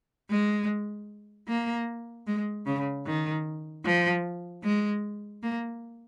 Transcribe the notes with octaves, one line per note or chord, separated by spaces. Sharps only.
G#3
A#3
G#3
C#3
D#3
F3
G#3
A#3